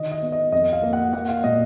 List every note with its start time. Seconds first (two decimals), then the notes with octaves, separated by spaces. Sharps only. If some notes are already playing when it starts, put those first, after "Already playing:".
Already playing: D3 D#3 D#5
0.11 D#5
0.22 B3
0.32 D#5
0.52 F2 D#5
0.73 F5
0.83 A#3
0.93 F#5
1.13 A#3 F#5
1.28 F5
1.44 A#2 D#5